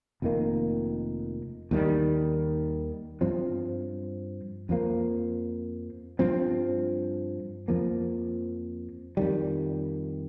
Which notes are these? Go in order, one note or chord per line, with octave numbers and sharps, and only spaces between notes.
F1 F2 D#3 A#3
D#2 D#3 G3
G2 F3 C4
F2 F3 A#3
G2 F3 C4
F2 F3 A#3
F2 D#3 G3